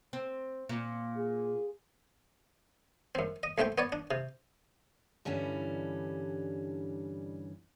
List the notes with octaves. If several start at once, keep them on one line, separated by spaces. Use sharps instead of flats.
C4
A#2
G#4
F#2 C4
D#5
B1 A3 C4 E5 G5
B3 C#5 D5
D4
C3
G2 D3 E3 G3 C#4